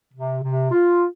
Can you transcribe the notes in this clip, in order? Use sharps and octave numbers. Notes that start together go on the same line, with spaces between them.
C3
C3
F4